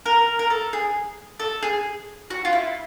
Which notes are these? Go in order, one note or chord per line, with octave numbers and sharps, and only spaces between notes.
A#4
A#4
A4
G#4
A4
G#4
F#4
F4
E4